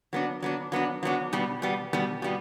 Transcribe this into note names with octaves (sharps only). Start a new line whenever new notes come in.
F#3 B3 D4
F#3 B3 D4
F#3 B3 D4
F#3 B3 D4
B2 G3 B3
B2 G3 B3
B2 G3 B3
B2 G3 B3